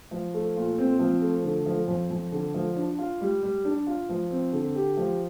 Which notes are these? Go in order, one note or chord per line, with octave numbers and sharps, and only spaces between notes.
F3
A3
A#2
C4
F3
A3
D3
F3
F2
F2
D3
F3
D4
F4
G3
G3
D4
F4
F3
C4
D3
G4
F3